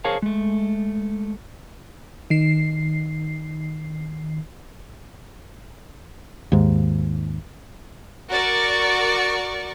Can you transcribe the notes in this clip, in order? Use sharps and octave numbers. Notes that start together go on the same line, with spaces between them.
G#4 A#4 C5 C#5 F5 A5
G#3 A3
D#3 C7
D#2 G#2
F#4 A#4 D5 C#6